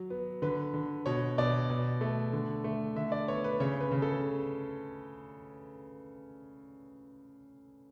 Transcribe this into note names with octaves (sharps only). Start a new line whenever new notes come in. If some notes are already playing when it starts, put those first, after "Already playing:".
Already playing: F#3
B3
D3 B4
D3
B2 C#5
B2 D5
B2
A3
D3
A3
D3 E5
D5
B3 C#5
B4
C#3 C#5
B4
C#3
A4